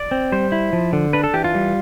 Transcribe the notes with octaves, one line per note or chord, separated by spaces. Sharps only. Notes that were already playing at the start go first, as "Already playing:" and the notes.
Already playing: D5
C4
G3 C5
E4
F3
D3
D4 B4
A4
E3 G4
F4
G3